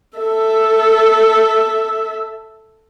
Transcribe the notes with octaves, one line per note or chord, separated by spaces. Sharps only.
A4 E5